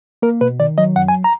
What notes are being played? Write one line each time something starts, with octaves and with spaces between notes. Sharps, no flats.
A#3 A#4
B2 B4
D#3 D5
F#3 D#5
F#2 F#5
G#5
A#5